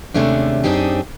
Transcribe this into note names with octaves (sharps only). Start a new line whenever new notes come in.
D#2 C3 G#3 A3 C#4 D4
F#2 C4 D4 D#4 G4 G#4